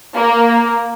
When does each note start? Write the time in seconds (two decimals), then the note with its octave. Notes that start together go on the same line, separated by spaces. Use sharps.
0.15 A#3